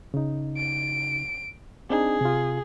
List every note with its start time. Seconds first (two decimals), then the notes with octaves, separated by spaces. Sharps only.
0.14 C#3 D#4
0.57 D7
1.90 C4 D4 D#4 G#4
2.21 C3 F4